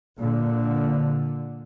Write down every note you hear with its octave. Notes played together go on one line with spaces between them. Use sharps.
A#2 D3